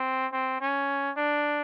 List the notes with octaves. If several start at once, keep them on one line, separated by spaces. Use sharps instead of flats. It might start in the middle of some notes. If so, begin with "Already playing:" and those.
Already playing: C4
C4
C#4
D4